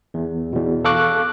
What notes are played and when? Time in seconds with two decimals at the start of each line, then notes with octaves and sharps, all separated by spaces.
0.14 E2
0.53 E2 B2
0.85 A4 F5 C#6 D6 F#6